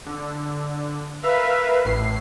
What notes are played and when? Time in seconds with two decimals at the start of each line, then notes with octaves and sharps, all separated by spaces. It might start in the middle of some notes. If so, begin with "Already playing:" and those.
0.07 D3
1.23 A#4 B4 E5 F5
1.85 A1 A2 C7